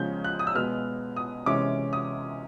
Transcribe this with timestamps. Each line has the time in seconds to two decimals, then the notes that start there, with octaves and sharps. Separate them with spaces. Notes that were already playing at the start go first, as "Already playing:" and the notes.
Already playing: C#3 F3 G#3 C#4 G6
0.24 F#6
0.39 D#6
0.47 E6
0.55 B2 G#3 B3 F6
1.16 D#6
1.46 C3 E3 G#3 C#4 D6
1.93 D#6